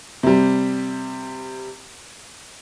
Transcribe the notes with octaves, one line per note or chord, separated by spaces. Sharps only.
C3 G3